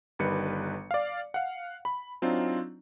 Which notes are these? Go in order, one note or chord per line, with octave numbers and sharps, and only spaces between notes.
G1 D#3 G3 B4 C#7
D5 F5
F5 F#5
B5
F#3 C4 D4 D#4 F4